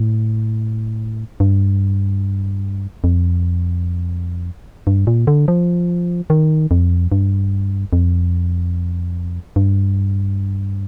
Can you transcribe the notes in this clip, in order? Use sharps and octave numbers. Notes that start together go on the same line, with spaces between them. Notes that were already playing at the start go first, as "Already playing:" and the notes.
Already playing: A2
G2
F2
G2
A#2
D3
F3
D#3
F2
G2
F2
G2